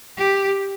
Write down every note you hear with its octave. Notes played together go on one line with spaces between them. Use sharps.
G4